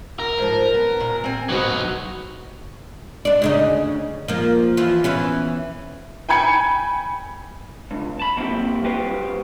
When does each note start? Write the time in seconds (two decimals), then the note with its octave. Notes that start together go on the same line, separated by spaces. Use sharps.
0.19 A#4
0.38 G#2 F3
0.74 B3
1.00 A#2
1.24 C4 G#5
1.49 G#2 F#3 D#4 F#4 B4
3.25 D4 D5
3.42 D2 C#3 D#4
4.28 F3 A#3
4.77 E3 F3 F4
5.04 E3 B3 C#4
6.29 G5 G#5 B5 G#6 C#7
7.91 C#2 G2
8.20 A5 B5
8.37 F#3 A#3 C4 E4 G4
8.84 G3 F#4 G4 B4 C5